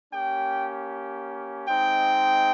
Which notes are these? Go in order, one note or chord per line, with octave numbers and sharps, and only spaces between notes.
A#3 C#4 G4 G5
G#3 C4 D#4 G5